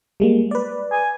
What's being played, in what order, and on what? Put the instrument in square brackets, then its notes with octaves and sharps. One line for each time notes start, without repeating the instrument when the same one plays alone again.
[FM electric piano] G3 G#3 A#3
B4 D5
[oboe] G#5